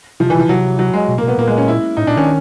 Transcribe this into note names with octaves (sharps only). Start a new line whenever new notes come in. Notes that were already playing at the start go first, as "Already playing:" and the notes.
C3 F3
E3
C3 F3
C3 F#3
F#3
G#3
B2
A#3
B2 B3
A#2 A#3
G#3
C#4
E4
A2 D#4
A#2 D4
D#3 C#4